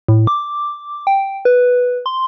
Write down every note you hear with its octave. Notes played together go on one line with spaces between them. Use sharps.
A2
D6
G5
B4
C6